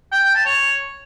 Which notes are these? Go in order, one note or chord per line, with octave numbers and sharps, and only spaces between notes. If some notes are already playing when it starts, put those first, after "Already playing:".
G5
G5
A5
C#5